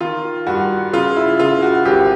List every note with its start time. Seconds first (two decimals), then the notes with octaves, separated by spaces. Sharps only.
0.01 D#3 F4
0.47 G2 F#4
0.93 C#3 F4
1.16 E4
1.39 C#3 F4
1.62 F#4
1.85 G#1 G4